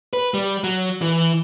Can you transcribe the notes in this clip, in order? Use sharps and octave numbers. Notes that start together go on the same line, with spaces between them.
B4
G3
F#3
E3